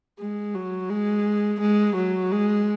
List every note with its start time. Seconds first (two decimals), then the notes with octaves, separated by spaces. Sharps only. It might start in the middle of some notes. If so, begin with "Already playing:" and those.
0.19 G#3
0.55 F#3
0.89 G#3
1.61 G#3
1.96 F#3
2.32 G#3